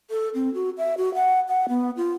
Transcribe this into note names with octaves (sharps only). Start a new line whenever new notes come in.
A4
C4
F#4
E5
F#4
F#5
F#5
B3
F4